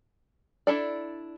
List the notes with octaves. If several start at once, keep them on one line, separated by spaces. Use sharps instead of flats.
D4 E4 A4 D5